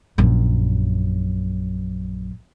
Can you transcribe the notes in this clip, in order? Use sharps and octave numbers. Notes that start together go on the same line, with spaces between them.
A#1 F#2